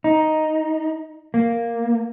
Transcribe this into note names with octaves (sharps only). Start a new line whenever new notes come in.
D#4
A#3